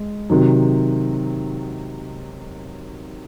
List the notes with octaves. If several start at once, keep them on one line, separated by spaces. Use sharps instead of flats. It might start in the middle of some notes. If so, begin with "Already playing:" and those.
Already playing: G#3
C3 D#3 F#3